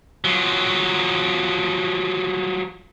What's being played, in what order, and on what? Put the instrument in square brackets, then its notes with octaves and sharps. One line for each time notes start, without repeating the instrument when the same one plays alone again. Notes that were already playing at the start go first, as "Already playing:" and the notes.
[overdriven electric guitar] F3 F#3